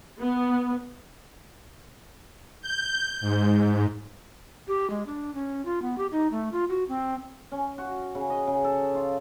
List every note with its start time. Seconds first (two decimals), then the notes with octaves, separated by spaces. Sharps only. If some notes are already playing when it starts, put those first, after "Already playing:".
0.20 B3
2.62 G6
3.21 G#2
4.68 G4
4.90 G#3
5.06 D4
5.34 C#4
5.65 F4
5.82 B3
5.98 G4
6.12 D#4
6.31 A3
6.52 F4
6.69 F#4
6.88 C4
7.52 C#4
7.78 F#4
8.15 C#3
8.30 D#5
8.48 C#3
8.64 A4
8.95 F4